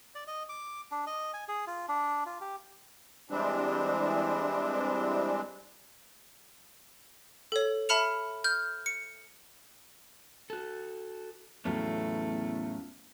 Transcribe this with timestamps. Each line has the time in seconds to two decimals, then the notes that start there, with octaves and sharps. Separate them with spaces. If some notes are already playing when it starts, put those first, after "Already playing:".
0.15 D5
0.27 D#5
0.49 D6
0.91 D4
1.07 D#5
1.33 G#5
1.48 G#4
1.67 F4
1.89 D4
2.26 F4
2.41 G4
3.30 E3 G3 G#3 C4 D4
7.52 A4 C#5
7.89 E5 A5 B5 F6 C#7 F7
8.44 F6 G6
8.86 C#7
10.50 F#4 A4
11.65 E2 A2 F#3 A3 B3 C#4 F4